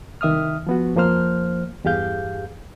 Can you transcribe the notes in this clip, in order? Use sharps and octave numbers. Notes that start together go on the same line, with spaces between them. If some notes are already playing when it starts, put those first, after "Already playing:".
C2 D#3 E5 D#6 F6
F3 B3 F#4
F2 F3 A#3 C5 F6
E2 G2 G4 G#4 F5 G6